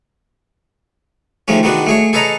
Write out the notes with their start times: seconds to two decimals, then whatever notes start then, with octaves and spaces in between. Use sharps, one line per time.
1.48 D#3 F3 G#3 A3 C#4
1.63 D#3 G#3 B3 D4 F#4
1.86 A3 G#4 C#5
2.13 G#4 A4 B4 C#5 D#5 A#5